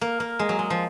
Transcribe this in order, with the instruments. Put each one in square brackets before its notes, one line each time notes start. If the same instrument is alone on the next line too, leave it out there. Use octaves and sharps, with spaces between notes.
[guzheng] A#3
A#3
G#3
F#3
G#3
F3